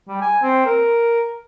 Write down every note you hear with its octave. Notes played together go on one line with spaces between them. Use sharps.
G3
G#5
C4
A#4